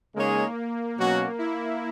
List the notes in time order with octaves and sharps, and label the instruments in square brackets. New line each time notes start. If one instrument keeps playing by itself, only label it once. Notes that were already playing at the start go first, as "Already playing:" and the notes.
[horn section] C#3 G#3 D#4 G#4 C#5 [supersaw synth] A#3
[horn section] B2 F#3 C#4 F#4
[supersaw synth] E4